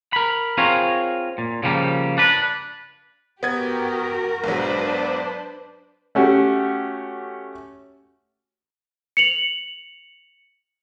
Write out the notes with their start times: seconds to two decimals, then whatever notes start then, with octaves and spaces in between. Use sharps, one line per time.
0.13 A#4 B5
0.58 C4 F4 G#4 A#4 C#5
1.38 A#2
1.63 C#3 F3 G3 A#3
2.18 D4 B4
3.43 B3 F#4 G4 A#4 G#6
4.44 B1 G#2 F#3 D4 B4 C5
6.15 A3 C#4 F#4 G4
9.17 C#7 F7 F#7